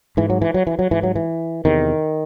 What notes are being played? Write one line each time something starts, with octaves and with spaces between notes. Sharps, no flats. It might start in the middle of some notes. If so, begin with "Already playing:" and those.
G#2 E3
F#3
E3
F#3
E3
F#3
G#2 E3
F#3
E3
E2 C3 D#3